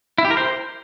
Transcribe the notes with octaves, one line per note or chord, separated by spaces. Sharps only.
E4
G4
A#4
C5